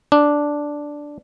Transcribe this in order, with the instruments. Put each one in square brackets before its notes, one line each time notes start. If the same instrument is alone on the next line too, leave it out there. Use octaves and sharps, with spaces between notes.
[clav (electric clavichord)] D4